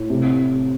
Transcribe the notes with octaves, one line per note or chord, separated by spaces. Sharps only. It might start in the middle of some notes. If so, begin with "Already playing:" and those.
Already playing: A2
C3